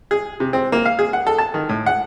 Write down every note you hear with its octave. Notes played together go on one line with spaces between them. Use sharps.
G#4
C3
C4
A#3
F5
G#4
F#5
A4
A5
D#3
A2
F#5